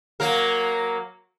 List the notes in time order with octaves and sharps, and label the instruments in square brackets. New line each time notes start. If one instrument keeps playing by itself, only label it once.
[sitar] F#3 A#3 A#4